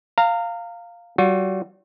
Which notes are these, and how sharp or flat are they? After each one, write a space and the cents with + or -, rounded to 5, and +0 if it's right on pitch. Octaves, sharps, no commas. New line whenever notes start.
F5 +0 A#5 -30
G3 -45 F#4 -40